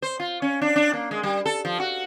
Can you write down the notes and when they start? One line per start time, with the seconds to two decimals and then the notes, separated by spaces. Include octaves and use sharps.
0.02 C5
0.20 F4
0.42 C#4
0.62 D4
0.76 D4
0.93 A#3
1.11 G#3
1.23 G3
1.46 A4
1.65 F3
1.80 F#4